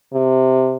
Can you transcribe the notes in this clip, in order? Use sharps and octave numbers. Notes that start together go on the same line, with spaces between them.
C3